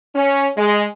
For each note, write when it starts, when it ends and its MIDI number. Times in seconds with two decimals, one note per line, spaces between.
0.15 0.46 61
0.57 0.84 56